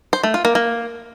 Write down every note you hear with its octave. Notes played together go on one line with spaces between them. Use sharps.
C5
A3
F4
A#3
A#3